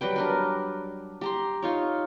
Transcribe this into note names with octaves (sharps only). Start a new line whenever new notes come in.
F#3 G3 B4 G5
D4 A#4 B4
G4 A#5 C6
D#4 F4 C#5